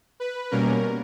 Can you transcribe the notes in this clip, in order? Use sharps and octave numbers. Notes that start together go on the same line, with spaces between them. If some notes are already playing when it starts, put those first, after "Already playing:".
B4
B2 G3 A#3 C#4 A#4